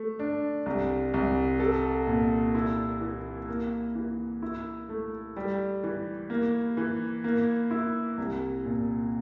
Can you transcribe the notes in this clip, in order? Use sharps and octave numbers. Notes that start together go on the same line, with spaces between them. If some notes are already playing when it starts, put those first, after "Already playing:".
Already playing: A3
D4
C2
C2
A4
A#2
E4
E3
A#3
E3
E4
A3
G3
E3
A#3
E3
A#3
E4
C2
A#2